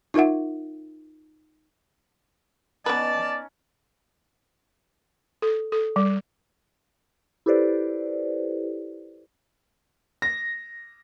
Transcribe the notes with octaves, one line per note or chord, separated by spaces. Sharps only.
D#4 F4 A#4 E5 F#5
B3 C#4 D#4 B4 D5 A5
A4
A4
G3
E4 G4 A4 B4 C5 D5
A#6